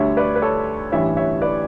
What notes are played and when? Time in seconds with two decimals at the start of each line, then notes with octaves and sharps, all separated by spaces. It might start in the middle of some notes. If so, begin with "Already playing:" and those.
Already playing: D2 D3 G3 C#5 E5
0.17 B4 D5
0.36 B4
0.42 A4 C#5
0.92 A1 G2 E3 G3 C#5 E5
1.17 C#5 E5
1.41 B4 D5